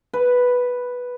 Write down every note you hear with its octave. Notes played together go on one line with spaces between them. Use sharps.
B4